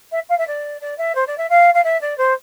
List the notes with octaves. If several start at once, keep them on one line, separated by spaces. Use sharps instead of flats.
E5
F5
E5
D5
D5
E5
C5
D5
E5
F5
F5
E5
D5
C5